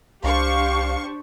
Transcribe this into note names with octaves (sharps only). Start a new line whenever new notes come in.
C2 D4 G4 C5 F5 C#6